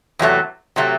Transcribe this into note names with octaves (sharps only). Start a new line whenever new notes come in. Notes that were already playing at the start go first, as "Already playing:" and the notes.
E2 C3 F#3 A3
C3 F#3 A3